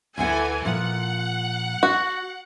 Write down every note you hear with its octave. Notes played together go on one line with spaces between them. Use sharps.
D2 E3 A4 F#5 G#5
A#2 F3 F#5
F#4